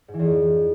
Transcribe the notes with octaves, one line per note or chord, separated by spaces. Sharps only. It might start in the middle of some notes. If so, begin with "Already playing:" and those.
G#2
E3
E2
F2